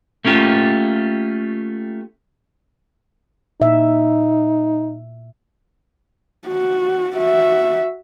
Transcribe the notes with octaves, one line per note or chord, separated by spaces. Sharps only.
A3 A#3 C#4 F4 G4
A#2 D#4 E5
F#4
F#4 E5